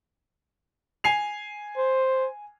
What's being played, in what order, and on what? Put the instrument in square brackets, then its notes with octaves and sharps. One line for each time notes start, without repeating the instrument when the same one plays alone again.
[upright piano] G#5 C7 F7
[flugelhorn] C5